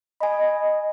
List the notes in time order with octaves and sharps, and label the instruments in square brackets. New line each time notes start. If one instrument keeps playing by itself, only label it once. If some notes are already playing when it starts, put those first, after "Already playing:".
[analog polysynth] D#5 [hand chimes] G#5 B5